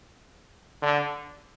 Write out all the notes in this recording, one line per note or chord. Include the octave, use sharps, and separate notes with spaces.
D3